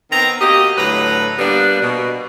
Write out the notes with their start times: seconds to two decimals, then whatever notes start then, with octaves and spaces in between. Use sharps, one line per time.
0.11 D#3 B3 C4 A#5
0.41 A#3 F#4 G4 D#5
0.77 A2 D3 F#3 B4 A#5
1.39 G3 A#3 B3 D4
1.82 B2